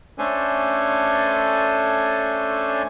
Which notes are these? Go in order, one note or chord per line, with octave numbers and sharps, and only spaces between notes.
A3 C#4 D4 A4 C5 G#5